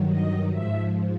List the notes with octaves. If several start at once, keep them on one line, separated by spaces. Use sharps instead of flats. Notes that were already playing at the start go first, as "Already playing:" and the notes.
Already playing: G2 D#3 F#3
D#5
G#2 F3 E5